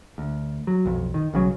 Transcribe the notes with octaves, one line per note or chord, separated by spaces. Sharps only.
D2
F#3
B1 F2
D#3
B1 C#3 F#3